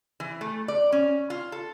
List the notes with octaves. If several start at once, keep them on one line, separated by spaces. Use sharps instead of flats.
E3
A3
D5
C#4
F4
A4